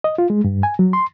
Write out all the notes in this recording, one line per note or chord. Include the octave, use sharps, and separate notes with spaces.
D#5
F4
G#3
G2
G#5
F#3
C6